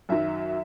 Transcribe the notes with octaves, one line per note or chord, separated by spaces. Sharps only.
F#2 D#3 F#3 E5